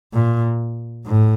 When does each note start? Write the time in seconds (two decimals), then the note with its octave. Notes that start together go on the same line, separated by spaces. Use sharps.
0.13 A#2
1.06 A2